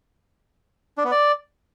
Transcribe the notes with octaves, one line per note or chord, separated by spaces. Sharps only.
D4
B3
D5